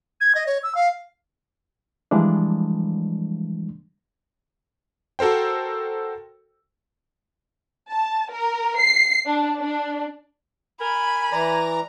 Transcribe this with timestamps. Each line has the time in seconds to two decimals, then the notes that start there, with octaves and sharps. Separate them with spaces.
0.21 G#6
0.35 D#5
0.47 C#5
0.63 E6
0.75 F5
2.11 E3 F3 G3 G#3 A#3 D4
5.19 F#4 A4 A#4 C5 G5
7.90 A5
8.31 A#4
8.79 C7
9.26 D4
9.59 D4
10.81 A#4 G#5 B5
11.32 E3 D5 A#5